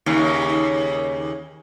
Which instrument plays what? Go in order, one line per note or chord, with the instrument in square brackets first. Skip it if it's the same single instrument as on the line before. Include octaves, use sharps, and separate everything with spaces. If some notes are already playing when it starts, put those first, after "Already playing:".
[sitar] D#2 C#3